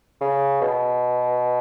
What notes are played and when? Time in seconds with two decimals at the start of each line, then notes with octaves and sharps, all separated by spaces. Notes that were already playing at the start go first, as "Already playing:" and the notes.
0.21 C#3
0.61 B2